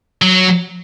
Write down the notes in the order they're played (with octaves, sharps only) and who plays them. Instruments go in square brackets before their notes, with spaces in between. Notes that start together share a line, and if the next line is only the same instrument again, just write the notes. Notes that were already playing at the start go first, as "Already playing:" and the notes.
[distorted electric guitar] F#3